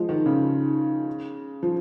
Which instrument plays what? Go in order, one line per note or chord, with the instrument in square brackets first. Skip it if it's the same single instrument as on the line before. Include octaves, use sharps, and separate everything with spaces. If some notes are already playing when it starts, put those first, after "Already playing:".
Already playing: [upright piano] F3 G#3
D#3
C#3
F3